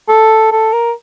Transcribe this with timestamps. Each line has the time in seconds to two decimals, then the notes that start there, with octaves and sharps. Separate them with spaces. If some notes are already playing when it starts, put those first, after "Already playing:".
0.09 A4
0.52 A4
0.73 A#4